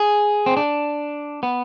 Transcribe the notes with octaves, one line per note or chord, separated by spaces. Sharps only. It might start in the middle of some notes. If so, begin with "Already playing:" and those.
Already playing: G#4
C4
D4
B3